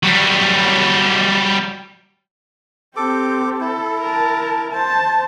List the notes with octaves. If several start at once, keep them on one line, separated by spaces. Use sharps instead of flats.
F#3 G3
C4 G4 A4 D6
E4 A4
A#4 A5
C5 A5